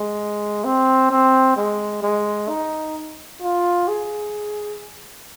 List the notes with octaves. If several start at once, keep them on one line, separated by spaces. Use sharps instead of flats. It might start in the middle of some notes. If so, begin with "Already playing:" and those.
Already playing: G#3
C4
C4
G#3
G#3
D#4
F4
G#4